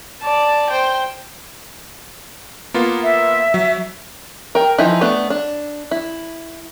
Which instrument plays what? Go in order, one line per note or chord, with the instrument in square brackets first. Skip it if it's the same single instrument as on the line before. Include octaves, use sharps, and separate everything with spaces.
[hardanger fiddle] D5 A5
C5 G5
[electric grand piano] A#3 B3 F4
[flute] E5
[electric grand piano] F#3
[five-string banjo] A#4 G5
E3 F3 D#4 E4
A3 B3 D4
D4
E4